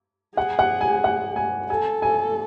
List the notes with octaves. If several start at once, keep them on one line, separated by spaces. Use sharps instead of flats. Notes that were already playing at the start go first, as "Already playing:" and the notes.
G#4 F#5
F#5
G#5
F#5
G#5
A4 G#5
G#5